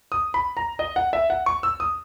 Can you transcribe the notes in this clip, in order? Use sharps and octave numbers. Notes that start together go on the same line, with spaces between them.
D#6
B5
A#5
D#5
F#5
E5
F#5
C#6
E6
D#6